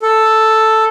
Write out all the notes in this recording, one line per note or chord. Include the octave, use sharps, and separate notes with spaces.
A4